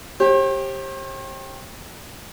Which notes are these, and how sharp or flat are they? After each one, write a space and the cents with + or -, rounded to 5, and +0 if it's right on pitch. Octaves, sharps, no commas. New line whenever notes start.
G4 +0 C5 +45